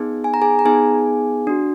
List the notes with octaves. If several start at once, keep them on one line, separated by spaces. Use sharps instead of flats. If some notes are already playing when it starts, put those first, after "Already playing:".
Already playing: B3 D#4 G#4
G#5
A#5
G#4 G#5
A#5
B3 D#4 G#4 G#5
D4 F#4